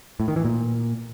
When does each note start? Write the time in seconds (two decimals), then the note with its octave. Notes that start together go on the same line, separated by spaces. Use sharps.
0.20 A2
0.28 D#3
0.36 E3
0.45 A#2